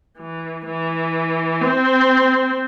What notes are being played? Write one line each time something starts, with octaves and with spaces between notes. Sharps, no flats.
E3
E3
C4